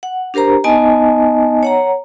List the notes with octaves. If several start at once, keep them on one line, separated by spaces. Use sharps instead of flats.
F#5
D4 G4 A#4 C5 A#5
B3 D#4 D#5 G#5 A5
C#5 F#5 A#5